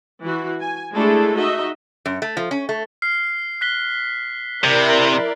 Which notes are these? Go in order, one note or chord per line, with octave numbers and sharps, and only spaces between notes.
E3 F#4
G#5
G#3 A3 D4 E4 G#4 A4
D#4 F#4 D#5 E5
F#2
A3
F3
C#4
A3
F6 C7
F#6 B6 G7
C3 E4 A#4 D5